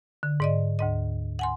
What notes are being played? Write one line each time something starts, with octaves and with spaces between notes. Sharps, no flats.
D3
G#2 D5 D#5
D2 G#2 D#5
F#5 G#5 C6